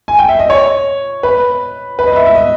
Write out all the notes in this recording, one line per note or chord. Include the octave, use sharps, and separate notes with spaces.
G#5
G5
E5
D#5
C#5
B4
B4
D#5
E5
E5
D#5